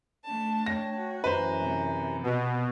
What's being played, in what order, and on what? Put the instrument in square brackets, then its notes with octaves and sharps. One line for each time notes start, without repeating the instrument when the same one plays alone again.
[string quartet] A3 D4 A5
[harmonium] C#5 G5 [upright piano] A#6
[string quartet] F#4
[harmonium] F#2 E3 A#5 [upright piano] B4 C5
[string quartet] C3
[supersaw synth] B2